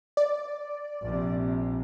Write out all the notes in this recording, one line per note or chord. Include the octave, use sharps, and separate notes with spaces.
D5
A#1 C3